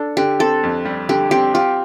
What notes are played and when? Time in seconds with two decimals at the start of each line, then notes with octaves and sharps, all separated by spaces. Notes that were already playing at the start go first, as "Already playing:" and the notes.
Already playing: D4 A4
0.17 D3 G4
0.39 C4 A4
0.63 F2
0.85 G3
1.09 D3 G4
1.31 C4 G4
1.54 F4 G4